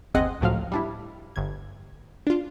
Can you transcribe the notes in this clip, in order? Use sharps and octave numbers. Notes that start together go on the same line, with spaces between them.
G1 D#2 C4 G#4 D#5 F#5
C#2 A2 F3 F#3 F5
G3 D4 E4
G1 G#6
D4 F4